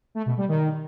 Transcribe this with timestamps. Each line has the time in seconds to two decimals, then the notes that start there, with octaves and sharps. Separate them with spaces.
0.15 A3
0.26 B2
0.37 G3
0.48 D#3